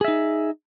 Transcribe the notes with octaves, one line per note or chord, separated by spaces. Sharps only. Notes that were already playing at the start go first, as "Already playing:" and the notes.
D#4 G#4 E5